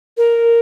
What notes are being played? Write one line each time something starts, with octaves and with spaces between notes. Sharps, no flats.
A#4